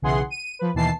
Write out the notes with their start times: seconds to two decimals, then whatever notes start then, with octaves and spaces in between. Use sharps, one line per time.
0.02 B1 C#3 E3 G#4 F#5 C6
0.30 D#7
0.59 F3 B4
0.74 D#2 B2 D#3 E3 A5 C7